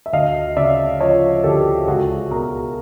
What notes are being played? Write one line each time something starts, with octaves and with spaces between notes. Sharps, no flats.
E5
D2 D#5 F5
C#3 D5 E5
F3 C#5 D#5
D2 G4 A4
C#2 F#4 G#4
B2 G#4 A#4